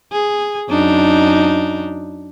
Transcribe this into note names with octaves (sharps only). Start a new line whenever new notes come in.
G#4
F#2 D4 D#4